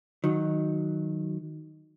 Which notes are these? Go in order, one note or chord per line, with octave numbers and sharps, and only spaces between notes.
D#3 F#3